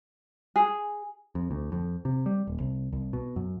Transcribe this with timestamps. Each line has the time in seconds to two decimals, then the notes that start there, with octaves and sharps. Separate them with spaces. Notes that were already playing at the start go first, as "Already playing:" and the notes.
0.56 G#4
1.35 F2
1.51 D2
1.72 F2
2.05 C3
2.26 G3
2.47 D#1
2.60 C2
2.93 C2
3.13 B2
3.36 F#2